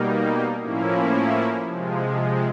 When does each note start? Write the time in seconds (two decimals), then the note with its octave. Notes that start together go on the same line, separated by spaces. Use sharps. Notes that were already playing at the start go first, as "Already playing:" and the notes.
Already playing: B2 G3 A#3 D#4
0.62 A2 F3 A#3 C#4 E4
1.64 C3 F3 G#3